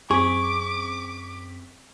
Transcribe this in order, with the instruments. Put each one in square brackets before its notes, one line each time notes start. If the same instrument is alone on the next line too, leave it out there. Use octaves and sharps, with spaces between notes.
[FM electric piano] F#2 C4 B6 [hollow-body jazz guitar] G#4 [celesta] C#6 [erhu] D6